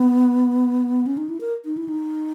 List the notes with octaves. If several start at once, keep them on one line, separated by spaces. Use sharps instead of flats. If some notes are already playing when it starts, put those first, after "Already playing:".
Already playing: B3
C#4
D#4
E4
A#4
D#4
E4
D#4